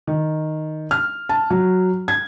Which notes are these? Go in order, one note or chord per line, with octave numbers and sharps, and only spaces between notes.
D#3
F6
A5
F#3
G#6